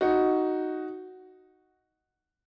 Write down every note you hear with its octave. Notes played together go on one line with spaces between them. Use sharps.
D#4 F#4